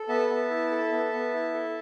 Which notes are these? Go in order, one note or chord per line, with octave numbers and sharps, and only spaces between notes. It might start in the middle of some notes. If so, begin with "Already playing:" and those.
Already playing: A4
B3 E5 A5
B3
E4
A4
B3
B3
E4
A4